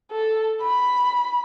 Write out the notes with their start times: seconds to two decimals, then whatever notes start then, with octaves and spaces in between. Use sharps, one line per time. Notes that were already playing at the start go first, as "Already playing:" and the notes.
0.12 A4
0.62 B5